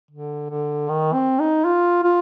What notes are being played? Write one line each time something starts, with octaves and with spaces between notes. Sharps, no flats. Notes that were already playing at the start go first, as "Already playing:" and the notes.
D3
D3
D#3
C4
D#4
F4
F4